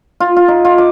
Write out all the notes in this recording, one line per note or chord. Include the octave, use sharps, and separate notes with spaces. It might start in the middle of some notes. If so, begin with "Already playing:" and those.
F4
F4
D#4
F4
D6